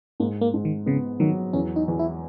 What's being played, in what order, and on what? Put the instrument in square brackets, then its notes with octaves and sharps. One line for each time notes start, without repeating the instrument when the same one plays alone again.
[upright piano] G#2 [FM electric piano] A#3
[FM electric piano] A#3
[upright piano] G#2
[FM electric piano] D#3
[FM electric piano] C#3 [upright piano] B3
[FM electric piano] D#3 [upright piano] F#3
[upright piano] E2 [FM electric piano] C#4
[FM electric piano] D#4
[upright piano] E2
[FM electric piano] E4